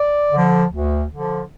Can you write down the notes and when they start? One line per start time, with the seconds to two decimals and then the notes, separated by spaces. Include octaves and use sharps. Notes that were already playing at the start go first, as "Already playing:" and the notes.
Already playing: D5
0.32 D3 F3
0.72 D2
1.12 D3 F3